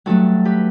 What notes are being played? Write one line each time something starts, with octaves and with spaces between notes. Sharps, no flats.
G2 F#3 A3 F#4 A4
G4 B4